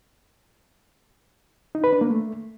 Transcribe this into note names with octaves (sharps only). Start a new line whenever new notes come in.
D#4
B4
D4
A#3
A3